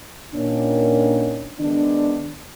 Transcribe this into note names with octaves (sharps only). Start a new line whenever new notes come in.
A#2 D#3 A#3 C#4 D4
D#3 G#3 B3 D4